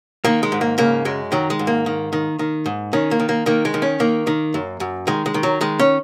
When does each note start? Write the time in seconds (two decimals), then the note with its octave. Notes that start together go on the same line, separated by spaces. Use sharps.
0.25 D#3 A#3
0.43 G#3
0.52 G#2
0.61 A#3
0.78 C#3 A#3
1.05 F#2 G#3
1.32 D#3 F#3
1.50 G#3
1.59 G#2
1.67 A#3
1.86 D#3
2.13 D#3
2.39 D#3
2.66 G#2
2.93 D#3 C#4
3.11 A#3
3.20 D#3
3.29 A#3
3.46 D#3 A#3
3.65 G#3
3.74 D#3
3.82 C#4
4.00 D#3 A#3
4.27 D#3
4.54 F#2
4.80 F#2
5.07 D#3 G#3
5.26 G#3
5.34 D#3
5.43 F#3
5.61 D#3 G#3
5.79 C#4